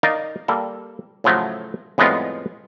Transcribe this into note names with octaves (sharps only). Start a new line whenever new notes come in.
D#4 A#4 D5 D#5 F5
G3 A#3 A4
A2 C#3 F3 F#3 A3
F2 A2 G3 G#3 B3 F4